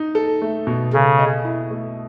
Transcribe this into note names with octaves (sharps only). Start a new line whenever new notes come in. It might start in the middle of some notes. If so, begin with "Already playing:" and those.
Already playing: D#4
A4
A3
B2
C#3 A4
D#5
E4
A3